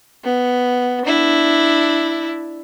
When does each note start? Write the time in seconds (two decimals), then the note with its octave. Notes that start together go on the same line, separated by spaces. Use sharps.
0.24 B3
1.05 D4 E4